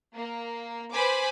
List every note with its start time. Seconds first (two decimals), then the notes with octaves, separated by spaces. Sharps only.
0.18 A#3
0.93 B4 C5 G#5 B5 D6